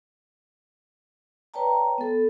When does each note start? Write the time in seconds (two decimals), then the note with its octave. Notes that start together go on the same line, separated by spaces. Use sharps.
1.54 B4 C#5 D5 G5 A5 A#5
1.98 B3 A4